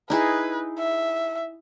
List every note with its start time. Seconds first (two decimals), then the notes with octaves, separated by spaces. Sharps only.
0.10 D#4 E4 G#4 B4
0.79 E5